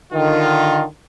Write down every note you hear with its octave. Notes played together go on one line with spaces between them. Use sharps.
D3 D#3 F4